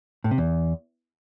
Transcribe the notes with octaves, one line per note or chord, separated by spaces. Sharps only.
A2
C3
E2